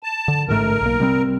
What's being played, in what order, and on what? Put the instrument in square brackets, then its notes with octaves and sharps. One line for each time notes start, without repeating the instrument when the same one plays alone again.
[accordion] A5
[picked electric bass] D3
[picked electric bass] A1 G#2 A3 [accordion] A#4
[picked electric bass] B1 A#3
C3 G3 C4